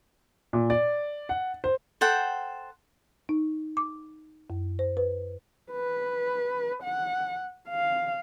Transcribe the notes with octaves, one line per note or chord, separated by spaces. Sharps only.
A#2
D5
F#5
C5
A4 C5 F#5 G5
D#4
D6
F#2
C5
B4
B4
F#5
F5